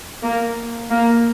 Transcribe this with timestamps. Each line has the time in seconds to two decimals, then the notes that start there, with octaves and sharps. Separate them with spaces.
0.23 A#3
0.91 A#3